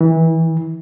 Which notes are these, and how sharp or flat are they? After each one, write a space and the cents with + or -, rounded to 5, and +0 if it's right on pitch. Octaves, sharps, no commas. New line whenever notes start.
E3 -25